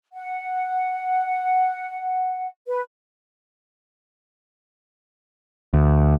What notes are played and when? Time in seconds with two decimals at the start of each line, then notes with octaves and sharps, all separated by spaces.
0.14 F#5
2.67 B4
5.74 D2